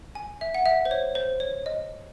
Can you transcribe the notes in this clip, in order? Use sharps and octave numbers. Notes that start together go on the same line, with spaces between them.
G#5
E5
F#5
E5
C5
C#5
C5
C#5
D#5